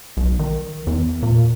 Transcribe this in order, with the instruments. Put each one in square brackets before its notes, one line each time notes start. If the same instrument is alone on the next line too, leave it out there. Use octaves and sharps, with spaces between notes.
[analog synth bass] B1
D#3
E2
A#2